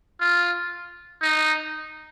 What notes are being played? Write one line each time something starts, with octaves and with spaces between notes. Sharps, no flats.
F4
D#4